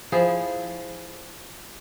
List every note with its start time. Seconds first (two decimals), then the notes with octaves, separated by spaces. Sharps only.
0.12 F3 E4 G#4